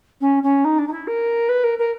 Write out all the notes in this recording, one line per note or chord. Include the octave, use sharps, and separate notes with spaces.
C#4
C#4
D#4
D4
D#4
E4
A#4
B4
A#4
A#4